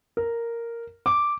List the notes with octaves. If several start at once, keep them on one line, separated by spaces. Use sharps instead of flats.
A#4
D6